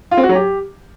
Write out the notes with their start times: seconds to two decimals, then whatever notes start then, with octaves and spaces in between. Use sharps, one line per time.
0.11 F4
0.17 C4
0.23 F#4
0.29 F#3
0.35 G4